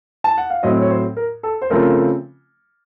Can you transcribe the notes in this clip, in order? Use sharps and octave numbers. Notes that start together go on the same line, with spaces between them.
A5
F#5
F5
A2 F#3 C4 D#5
C#5
C5
A#4
A4
C5
C#3 F3 A3 C4 A#4